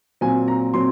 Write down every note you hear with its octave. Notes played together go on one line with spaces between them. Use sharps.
A#2 F#3 C4 G#5
A#5
A#2 F#3 C4 C6